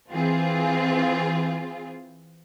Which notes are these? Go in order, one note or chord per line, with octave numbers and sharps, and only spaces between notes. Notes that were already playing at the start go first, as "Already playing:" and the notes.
E3 C4 F4 G#4